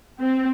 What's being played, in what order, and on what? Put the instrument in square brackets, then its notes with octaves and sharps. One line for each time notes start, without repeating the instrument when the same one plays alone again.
[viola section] C4